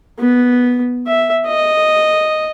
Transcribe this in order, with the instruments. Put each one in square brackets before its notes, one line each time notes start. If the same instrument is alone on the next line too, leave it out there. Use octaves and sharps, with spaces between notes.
[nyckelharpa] B3
E5
D#5